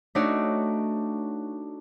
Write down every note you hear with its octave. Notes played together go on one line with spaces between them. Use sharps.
A3 D4 D#4 F#4 C#5 D5